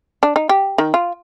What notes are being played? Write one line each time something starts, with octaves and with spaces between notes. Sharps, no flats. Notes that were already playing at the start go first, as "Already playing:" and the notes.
D4
D#4
G4
D#3
F4